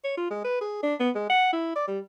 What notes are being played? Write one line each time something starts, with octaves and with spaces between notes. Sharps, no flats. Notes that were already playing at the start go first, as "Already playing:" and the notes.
C#5
F4
G#3
B4
G#4
D4
B3
G#3
F#5
E4
D5
G3